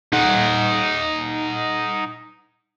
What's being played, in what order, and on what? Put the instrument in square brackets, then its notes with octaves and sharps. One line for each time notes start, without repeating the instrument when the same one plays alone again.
[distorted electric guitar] D#4 F#5